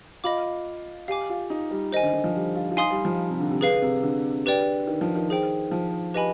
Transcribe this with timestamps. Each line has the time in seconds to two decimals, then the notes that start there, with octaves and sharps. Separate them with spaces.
0.24 F4 D#5 B5 D6
1.08 G4 F5 G#5 D6
1.30 F4
1.50 D#4
1.71 G3
1.92 D#3 C5 D#5 G#5
2.03 D3
2.13 D3
2.24 F3
2.35 G3
2.55 F4
2.71 F4
2.77 D#4 F5 G#5 C6 D#6
2.91 G3
3.05 F3
3.30 C3
3.40 D3
3.50 C3
3.61 D3 G#4 B4 F5
3.82 C3
4.03 D3
4.46 G4 B4 D5 G5
4.87 D#3
5.01 F3
5.15 D#3
5.30 G#4 C5 G5
5.71 F3
6.14 G4 B4 D#5 G#5 B5